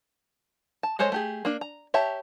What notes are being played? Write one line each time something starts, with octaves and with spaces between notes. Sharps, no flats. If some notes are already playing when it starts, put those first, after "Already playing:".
A5
G#3 A4 C5 C#5 D#5
A3 G4 G#4
A#3 D4
A#5
G4 C#5 E5 A5 A#5